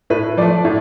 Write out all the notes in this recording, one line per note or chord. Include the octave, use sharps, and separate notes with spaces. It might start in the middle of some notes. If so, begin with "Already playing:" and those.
A2 B4
F3 A3 D5
A2